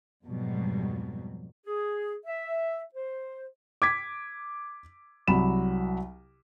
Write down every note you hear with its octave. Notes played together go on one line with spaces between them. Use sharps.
F2 G#2 B2 F#3 G3
G#4
E5
C5
D6 G#6 B6
C2 F#3 B5 E7